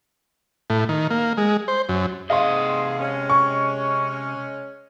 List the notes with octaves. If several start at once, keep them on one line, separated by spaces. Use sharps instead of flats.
A2
D#3
A#3
G#3
C5
F#2
G#2 C3 G#4 D#5 F5 C6
G#3 C#4
C#6